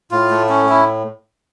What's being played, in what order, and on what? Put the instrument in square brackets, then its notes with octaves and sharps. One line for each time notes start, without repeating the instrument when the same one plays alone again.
[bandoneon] A2 [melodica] F4
[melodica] A3
C#4
E4